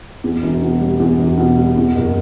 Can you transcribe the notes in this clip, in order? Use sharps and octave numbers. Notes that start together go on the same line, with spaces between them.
E2
E1
B2
G3
E2
E1
B2
G3
E2
F#1